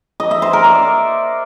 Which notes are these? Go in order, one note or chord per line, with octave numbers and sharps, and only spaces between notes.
D#5
E5
C5
A#4
D5